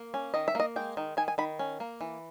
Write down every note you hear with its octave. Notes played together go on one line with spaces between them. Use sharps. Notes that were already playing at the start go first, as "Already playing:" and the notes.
Already playing: A#3
C#4
D#3 D#5
E5
A#3 D#5
G#3 G5
D#3
D#3 G#5
G#5
D#3 B5
C#4
A#3
E3